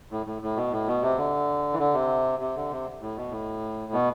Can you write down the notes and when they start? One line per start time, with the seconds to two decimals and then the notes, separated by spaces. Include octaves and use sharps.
0.11 A2
0.26 A2
0.42 A2
0.56 B2
0.72 A2
0.87 B2
1.02 C3
1.18 D3
1.73 E3
1.79 D3
1.94 C3
2.39 C3
2.56 D3
2.70 C3
3.01 A2
3.17 B2
3.31 A2
3.93 B2